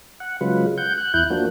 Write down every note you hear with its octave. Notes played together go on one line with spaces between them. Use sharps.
F#5
C#3 F#3 G#3 F4 B4
F#5 G6
F#6
E2 E4 F#6 G6
F3 A#3 D4 F#4